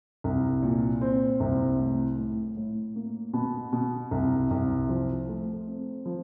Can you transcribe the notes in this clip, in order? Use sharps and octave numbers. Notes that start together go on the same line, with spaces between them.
C2
A#2
C4
C2
A2
A2
A2
A#3
B2
B2
C2
C2
F3
A3
C4
F3